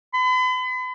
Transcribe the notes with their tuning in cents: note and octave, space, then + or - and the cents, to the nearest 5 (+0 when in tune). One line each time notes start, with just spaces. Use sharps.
B5 +40